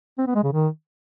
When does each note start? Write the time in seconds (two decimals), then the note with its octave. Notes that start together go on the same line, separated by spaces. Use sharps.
0.18 C4
0.27 B3
0.35 G#3
0.44 C#3
0.52 D#3